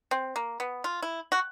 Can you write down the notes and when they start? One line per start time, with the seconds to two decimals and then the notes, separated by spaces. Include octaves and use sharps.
0.11 C4
0.36 A#3
0.60 B3
0.84 F4
1.02 E4
1.32 F#4